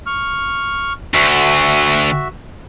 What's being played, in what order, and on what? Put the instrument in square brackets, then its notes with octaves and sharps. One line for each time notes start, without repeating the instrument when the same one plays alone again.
[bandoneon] C#6 F6
[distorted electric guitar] D2 [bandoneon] F#4 E5